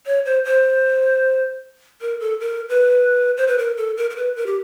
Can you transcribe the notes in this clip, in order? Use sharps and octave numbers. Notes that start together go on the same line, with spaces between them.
C#5
C5
C5
A#4
A4
A#4
B4
C5
B4
A#4
A4
A#4
A#4
B4
A#4
G4